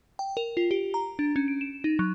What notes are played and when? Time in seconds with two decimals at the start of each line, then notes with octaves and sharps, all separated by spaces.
0.19 G5
0.37 A#4
0.57 F4
0.71 G4
0.94 A#5
1.19 D4
1.36 C#4
1.48 D7
1.61 E7
1.84 D#4
1.99 F#3